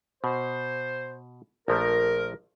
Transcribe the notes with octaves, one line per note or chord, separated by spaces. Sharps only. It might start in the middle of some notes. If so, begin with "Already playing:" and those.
B2 C5
A#1 F3 A3 A#4